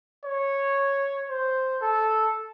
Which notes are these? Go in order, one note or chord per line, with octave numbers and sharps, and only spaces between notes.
C#5
C5
A4